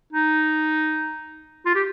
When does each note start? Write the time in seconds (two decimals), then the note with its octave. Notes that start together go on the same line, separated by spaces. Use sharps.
0.13 D#4
1.66 F4
1.75 G4